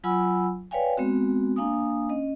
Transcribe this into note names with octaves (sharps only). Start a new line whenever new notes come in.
F#3 F4 F#5 G#5 B5 E6
B4 C#5 D5 F5 G5 G#5
G#3 B3 C4 F#4
A#3 D4 F5 G#5 D#6
C#4 D#5